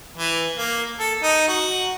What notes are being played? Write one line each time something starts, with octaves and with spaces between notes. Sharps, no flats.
E3
A#3
A4
D#4
F#4